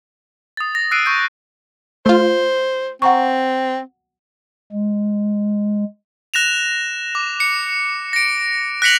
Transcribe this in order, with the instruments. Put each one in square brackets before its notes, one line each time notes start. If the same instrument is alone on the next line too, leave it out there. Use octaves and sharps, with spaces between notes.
[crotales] D#6 A6
A#6
E6 F#6 C7 D7 D#7
C#6 G6
[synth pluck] A3 F4 [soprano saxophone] C5
[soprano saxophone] C4 [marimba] F#5 A#5 C#6
[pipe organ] G#3
[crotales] F#6 A#6 E7 F7
D6
C#7
A#6 D7
F#6 A#6 B6 C#7 F7 F#7